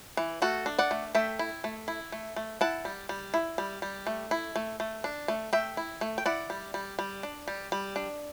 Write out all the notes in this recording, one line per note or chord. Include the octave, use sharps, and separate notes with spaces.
E3
A3 F#4 A4
D4
D5 F#5
A3
A3 E5 G5
E4
A3
E4
A3
A3
E4 F#5 A5
G3
G3
E4
G3
G3
A3
E4
A3
A3
D4
A3
A3 E5 G5
E4
A3
G5
E4 D5 F#5
G3
G3
G3
D4
G3
G3
D4